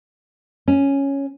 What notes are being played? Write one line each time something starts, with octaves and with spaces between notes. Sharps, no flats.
C#4